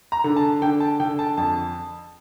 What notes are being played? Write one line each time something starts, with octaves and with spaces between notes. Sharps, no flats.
A#5
D3
A5
D3 G5
A5
D3 G5
A5
F2 A5